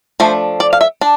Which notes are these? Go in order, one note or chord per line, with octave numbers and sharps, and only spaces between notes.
F3 A3 D4 C5
D5
F5
E5
D4